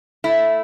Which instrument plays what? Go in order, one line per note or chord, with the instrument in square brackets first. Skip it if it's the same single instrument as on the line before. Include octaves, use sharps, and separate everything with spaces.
[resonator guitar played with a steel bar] A3 E4